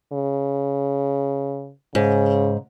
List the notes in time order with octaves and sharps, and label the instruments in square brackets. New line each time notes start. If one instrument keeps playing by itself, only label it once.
[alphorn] C#3
[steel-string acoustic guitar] G#2 [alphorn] C#3